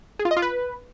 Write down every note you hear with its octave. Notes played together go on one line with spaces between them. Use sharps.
G#4
F4
D#5
F4
B4